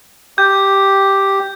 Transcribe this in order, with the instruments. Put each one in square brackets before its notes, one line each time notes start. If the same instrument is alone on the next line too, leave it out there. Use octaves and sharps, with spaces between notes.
[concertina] G4 [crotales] G6